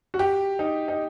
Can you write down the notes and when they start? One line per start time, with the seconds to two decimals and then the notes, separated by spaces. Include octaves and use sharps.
0.14 F#4
0.19 G4
0.59 D#4
0.88 D#4